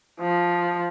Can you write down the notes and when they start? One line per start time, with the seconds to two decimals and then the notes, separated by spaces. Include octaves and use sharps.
0.20 F3